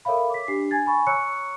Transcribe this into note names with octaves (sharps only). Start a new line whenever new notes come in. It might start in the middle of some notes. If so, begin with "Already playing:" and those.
A4 A#4 C#5 E5 F5 B5
D6 B6
D4 G4 C7
G#5 G#6 A6
G#5 B5 C#6
C#5 A#5 C#6 E6 F#6 C#7